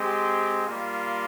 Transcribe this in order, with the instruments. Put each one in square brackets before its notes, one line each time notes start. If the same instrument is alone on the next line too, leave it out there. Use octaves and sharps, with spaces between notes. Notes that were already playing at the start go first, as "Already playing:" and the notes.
Already playing: [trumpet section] G#3 C4 G4
G3 A#3 F4